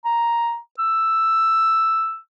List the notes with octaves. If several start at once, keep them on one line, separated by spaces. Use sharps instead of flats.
A#5
E6